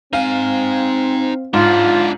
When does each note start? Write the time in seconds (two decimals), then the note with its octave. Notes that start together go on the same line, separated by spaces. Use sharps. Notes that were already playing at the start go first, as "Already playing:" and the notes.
0.13 C4 D#4 F5 G#5
1.54 G#2 D4 E4 F4